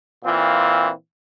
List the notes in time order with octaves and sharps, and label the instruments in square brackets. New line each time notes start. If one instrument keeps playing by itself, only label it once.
[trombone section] A#2 E3 C4 F4